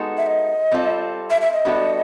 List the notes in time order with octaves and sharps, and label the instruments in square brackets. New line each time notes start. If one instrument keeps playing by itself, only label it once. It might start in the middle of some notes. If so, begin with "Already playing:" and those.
Already playing: [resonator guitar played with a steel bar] G#3 B3 D#4 F#4 A4
[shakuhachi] E5
D#5
[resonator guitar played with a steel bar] G3 C4 F4 A4
[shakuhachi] E5
E5
D#5
[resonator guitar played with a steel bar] G3 B3 D4 F#4 A4